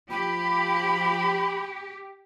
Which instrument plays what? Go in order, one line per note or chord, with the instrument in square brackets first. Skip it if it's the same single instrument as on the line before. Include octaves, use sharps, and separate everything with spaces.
[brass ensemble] F3 [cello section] G4 [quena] B5